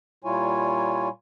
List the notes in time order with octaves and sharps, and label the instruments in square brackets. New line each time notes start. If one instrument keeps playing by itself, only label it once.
[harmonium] A#2 G3 E4 F4 C#5 G#5